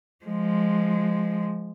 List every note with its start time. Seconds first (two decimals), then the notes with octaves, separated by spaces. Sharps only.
0.25 F3 G#3